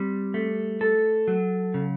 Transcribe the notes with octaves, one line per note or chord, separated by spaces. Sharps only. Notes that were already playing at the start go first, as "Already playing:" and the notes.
Already playing: G3 C4
A3
A4
F#3
C#3